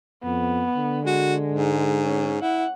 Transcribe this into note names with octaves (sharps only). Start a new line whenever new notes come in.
F2 B3
D3
G#3 F#4
G#2
C#4
E4 F#5